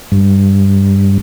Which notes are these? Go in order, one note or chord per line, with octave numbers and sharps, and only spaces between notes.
G2